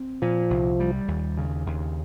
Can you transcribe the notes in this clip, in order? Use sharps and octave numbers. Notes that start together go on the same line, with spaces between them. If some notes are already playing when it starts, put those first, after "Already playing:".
Already playing: C4
A#2 F3
C2
G3
D#2
C#3
D#2